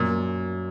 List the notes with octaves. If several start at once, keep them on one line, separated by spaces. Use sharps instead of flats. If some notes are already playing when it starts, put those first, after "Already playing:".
Already playing: F#2 A#2